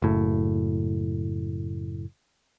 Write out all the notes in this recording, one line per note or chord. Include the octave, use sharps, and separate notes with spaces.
F#1 A2